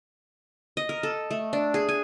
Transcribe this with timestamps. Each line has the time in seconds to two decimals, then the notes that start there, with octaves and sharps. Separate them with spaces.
0.77 D#5
0.89 A#4
1.03 A4
1.31 A3
1.53 D4
1.74 G#4
1.89 G#5